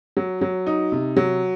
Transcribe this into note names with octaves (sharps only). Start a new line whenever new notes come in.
F#3
F#3
D#4
C3
F#3